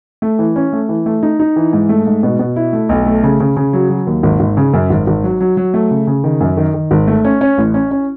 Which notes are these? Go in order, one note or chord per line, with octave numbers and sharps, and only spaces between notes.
A3
E3
C#4
A3
E3
A3
D#4
D#4
E3
G#2
A3
G#2
B2
B2
E4
A3
B1
A3
C#3
C#3
C#3
F#3
F#3
D#2
G#1
G#1
C#3
F#2
G#1
G#1
F#3
F#3
F#3
A3
C#3
C#3
D#3
F#2
D#3
D#3
G#1
A3
C#4
C#4
A1
C#4
C#4